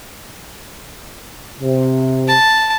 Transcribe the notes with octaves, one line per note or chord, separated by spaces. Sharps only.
C3
A5